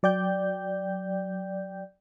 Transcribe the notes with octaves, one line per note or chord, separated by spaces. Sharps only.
F#3 D5 G5 G6